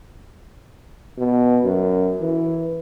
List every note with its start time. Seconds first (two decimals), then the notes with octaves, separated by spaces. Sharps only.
1.17 B2
1.64 F#2
2.21 E3